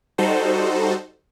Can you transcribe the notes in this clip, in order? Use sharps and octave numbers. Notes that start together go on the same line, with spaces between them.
G3 D#4 F#4 A4 C5